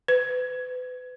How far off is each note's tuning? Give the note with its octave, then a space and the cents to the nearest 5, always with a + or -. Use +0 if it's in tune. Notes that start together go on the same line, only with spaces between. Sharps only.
B4 +35